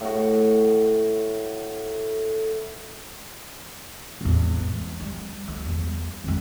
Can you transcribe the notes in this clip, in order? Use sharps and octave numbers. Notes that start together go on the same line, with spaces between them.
A2 F#4
A1 E2
G#3
G3
D2
E2 G3
F2 G#3